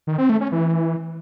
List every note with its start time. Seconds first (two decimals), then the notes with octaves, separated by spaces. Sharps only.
0.07 D#3
0.18 C4
0.30 A3
0.41 C#4
0.52 E3